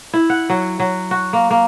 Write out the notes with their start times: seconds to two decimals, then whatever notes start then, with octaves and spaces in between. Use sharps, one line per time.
0.13 E4
0.30 F#5
0.50 F#3
0.80 F#3
1.11 F#4
1.33 A#3
1.51 A#3